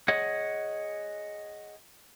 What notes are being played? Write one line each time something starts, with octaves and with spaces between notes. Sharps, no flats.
G#4 C#5 D#5 F#5